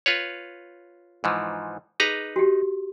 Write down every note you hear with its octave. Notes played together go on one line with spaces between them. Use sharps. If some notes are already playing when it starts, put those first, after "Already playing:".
F4 B4 C#5
G#2 E3 F3
D#4 G#4 B4 A#5
F#4 G4